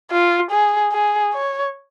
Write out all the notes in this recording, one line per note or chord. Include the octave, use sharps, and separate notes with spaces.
F4
G#4
G#4
C#5